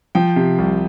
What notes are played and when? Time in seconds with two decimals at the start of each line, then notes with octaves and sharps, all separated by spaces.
0.15 F3 G5
0.36 C3
0.58 C2